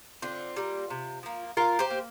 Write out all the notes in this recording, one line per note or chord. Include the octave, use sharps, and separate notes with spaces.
D3 C4 F4
G3 A#3
C3
F3 A#3
A#2 F4 A#4
G4 C5
A#3